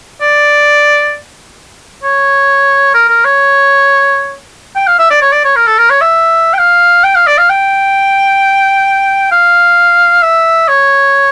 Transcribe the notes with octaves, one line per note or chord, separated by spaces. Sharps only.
D5
C#5
A#4
A#4
C#5
G5
F5
E5
D5
C#5
D5
C#5
A#4
A4
A#4
C#5
E5
G5
F5
G5
F5
D5
F5
G5
F5
E5
C#5